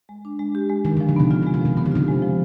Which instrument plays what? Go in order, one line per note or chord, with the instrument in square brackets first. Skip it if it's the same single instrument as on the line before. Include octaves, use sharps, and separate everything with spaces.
[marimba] G#3
D4
G#3
G4
G#3
[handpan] D#3 [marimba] G#3
[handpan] D3
[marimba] F3
[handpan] D3
[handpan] C3 [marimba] B3
[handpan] D3 [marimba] F4
[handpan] C3
[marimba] G#3
[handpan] D#3
[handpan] C3 [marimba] F3
[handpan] C3 [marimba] B3
[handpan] D3
[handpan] C3 [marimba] F4
[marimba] G#3
F3